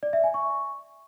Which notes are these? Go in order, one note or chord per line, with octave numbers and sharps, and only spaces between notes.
D5
E5
G#5
C#6